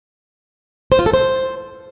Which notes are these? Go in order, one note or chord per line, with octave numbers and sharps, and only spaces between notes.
C5
F4
A4
C5